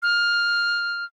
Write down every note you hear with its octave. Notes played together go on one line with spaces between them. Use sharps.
F6